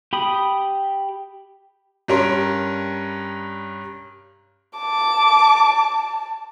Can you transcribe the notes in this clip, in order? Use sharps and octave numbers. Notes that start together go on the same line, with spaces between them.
G4 B5 D#6
G2 G3 C#4 A#4 C6
A5 D6